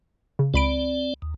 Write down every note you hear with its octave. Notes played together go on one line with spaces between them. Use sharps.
C#3
C#2 C4 D5 B5 D7
D#2